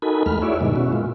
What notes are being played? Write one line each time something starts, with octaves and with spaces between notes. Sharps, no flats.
D#4 F#4 A4 A#4 G#5 B5
E2 G#3 A3 B5 F6
E4 F#4 G#4 C#5 D5 E5
G2 B2 D#3 G#3
B2 C#4 E4 F#4
A#2 G#3 F4